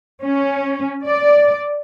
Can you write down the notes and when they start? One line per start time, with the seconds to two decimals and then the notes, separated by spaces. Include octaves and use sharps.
0.23 C#4
1.07 D5